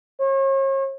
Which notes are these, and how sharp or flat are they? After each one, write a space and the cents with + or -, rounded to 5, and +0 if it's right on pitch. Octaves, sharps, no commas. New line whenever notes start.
C#5 -40